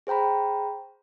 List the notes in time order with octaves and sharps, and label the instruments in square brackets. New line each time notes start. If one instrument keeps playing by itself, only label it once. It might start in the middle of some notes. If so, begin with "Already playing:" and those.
[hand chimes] G#4 C5 G5 A#5 B5